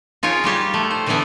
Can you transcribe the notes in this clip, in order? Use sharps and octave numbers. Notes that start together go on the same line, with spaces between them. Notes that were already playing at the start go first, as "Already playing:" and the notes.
D#4 F4 G#4 A#4 C#5
G3 F4 G4 C#5
A3
C5
D3 E3 G3 A3 B3 E4